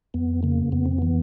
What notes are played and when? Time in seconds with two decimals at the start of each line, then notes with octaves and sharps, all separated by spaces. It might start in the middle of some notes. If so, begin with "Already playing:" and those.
0.14 F2 B3
0.43 C#3 A#3
0.72 F2 B3
0.86 C4
0.98 E3 B3